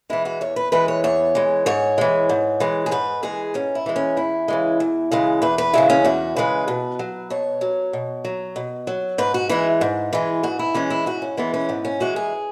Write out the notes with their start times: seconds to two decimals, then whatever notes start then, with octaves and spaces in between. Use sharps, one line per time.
0.10 E3 G#3 E4
0.25 F#4
0.41 E2 C#5
0.56 B4
0.72 E3 G#3 B4
0.88 C#5
1.04 E2 C#5
1.35 E3 G#3
1.66 G#2 C#5
1.98 E3 G#3
2.29 G#2
2.60 E3 G#3
2.86 G#4
2.91 G#2 B4
3.23 E3 G#3 G#4
3.54 G#2 C#4
3.75 E4
3.86 E3 G#3
3.96 C#4
4.17 E2 E4
4.48 C#3 E3 G#3
4.80 E2
5.11 C#3 E3 G#3
5.42 E2 B4
5.58 B4
5.73 C#3 E3 G#3 E4
5.90 C#4
6.05 E2 F#4
6.36 C#3 E3 G#3 B4
6.68 B2
6.99 F#3
7.30 B2 C#5
7.61 F#3
7.93 B2
8.25 F#3
8.56 B2
8.87 F#3
9.18 G#2 B4
9.34 F#4
9.49 E3 G#3 E4
9.81 G#2
10.13 E3 G#3
10.43 G#2 F#4
10.59 E4
10.74 E3 G#3 C#4
10.90 E4
11.06 G#2 F#4
11.22 C#4
11.37 E3 G#3 B3
11.54 C#4
11.69 G#2 B3
11.85 C#4
12.00 E3 G#3 F#4
12.16 G#4